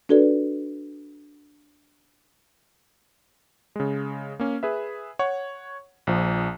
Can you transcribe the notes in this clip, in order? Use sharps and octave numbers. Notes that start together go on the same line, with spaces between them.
D4 F#4 A4 B4 D5
C#3 G#3
A#3 C#4
G#4 B4 E5
C#5 F#5 C#6
A#1 F3